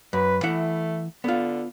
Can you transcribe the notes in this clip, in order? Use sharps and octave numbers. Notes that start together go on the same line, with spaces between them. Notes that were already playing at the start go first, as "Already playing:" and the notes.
F#2 B4
E3 A3 E4 F#5
D3 B3 F4